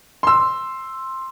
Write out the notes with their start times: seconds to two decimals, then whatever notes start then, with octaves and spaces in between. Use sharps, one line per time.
0.23 C6 E6